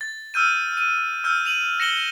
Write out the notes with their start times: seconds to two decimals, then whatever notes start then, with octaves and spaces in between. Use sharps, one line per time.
0.01 A6
0.34 E6 F6 G6 D#7
0.77 D#7
1.24 E6 F6 G6 D#7
1.45 D#7 F7 F#7
1.80 A#6 C#7 E7 F#7 G7